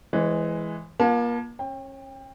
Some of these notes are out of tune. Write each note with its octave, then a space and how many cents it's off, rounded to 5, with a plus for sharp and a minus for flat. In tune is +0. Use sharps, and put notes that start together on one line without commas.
E3 +0 G#3 +0 C5 +40
A#3 +35 F4 +0 A5 -5
C#4 -30 G5 +25